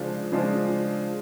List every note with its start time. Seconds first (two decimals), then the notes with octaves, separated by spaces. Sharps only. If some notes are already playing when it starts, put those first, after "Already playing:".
Already playing: C#3 F3 G#3 D4 F4
0.32 C#3 F3 G#3 D4 F4